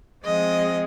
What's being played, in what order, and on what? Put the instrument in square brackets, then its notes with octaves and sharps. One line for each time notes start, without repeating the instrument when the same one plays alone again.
[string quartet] F3 G#3 C4 D#5